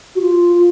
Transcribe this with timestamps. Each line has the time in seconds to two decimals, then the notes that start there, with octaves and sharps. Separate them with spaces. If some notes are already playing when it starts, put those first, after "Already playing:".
0.15 F#4
0.21 F4